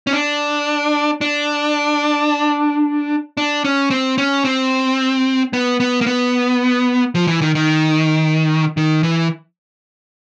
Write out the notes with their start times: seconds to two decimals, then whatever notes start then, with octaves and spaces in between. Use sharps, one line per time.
0.07 C#4
0.13 D4
1.21 D4
3.37 D4
3.64 C#4
3.90 C4
4.18 C#4
4.45 C4
5.53 B3
5.80 B3
6.01 A#3
6.06 B3
7.15 F3
7.27 E3
7.42 D#3
7.55 D#3
8.77 D#3
9.03 E3